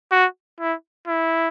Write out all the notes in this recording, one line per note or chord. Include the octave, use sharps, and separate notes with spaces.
F#4
E4
E4